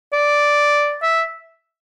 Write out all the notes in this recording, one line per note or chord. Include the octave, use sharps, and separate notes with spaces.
D5
E5